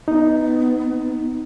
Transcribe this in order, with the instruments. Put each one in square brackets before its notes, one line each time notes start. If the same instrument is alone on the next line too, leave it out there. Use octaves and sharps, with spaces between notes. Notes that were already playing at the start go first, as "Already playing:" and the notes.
[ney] B3 [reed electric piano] D#4